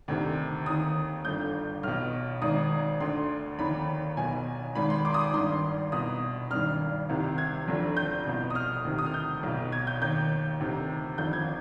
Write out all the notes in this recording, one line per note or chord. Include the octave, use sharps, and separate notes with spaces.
D2 C3 D#3
D#2 D#3 D#6
G1 G2 D3 G6
B1 B2 F6
G#1 G#2 D#3 D#6
D2 D3 C6
F1 D#2 D#3 B5
B1 B2 G#5
G#1 G#2 D#3 B5
C6
D6
D#6
D6
G#1 G2 D#3 C6
C2 B2 D#6
G#1 G2 D#3 F6
C2 C3 D#3
G#6
F1 F2 D3
G6
C2 B2
D#6
F6
D2 C3 D#3
D#6
F6
G6
B1 B2
G#6
G6
D#2 D#3 G6
D2 C3 D#3
G1 F2 D#3 G6
G#6